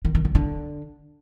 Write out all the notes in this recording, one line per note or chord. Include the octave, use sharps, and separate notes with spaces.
D#3
D#3
D3
D3